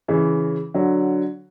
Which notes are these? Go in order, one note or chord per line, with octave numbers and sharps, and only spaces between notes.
C#3 E3
D3 F#3